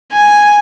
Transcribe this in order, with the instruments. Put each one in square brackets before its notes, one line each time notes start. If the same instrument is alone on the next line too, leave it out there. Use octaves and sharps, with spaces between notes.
[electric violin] G#5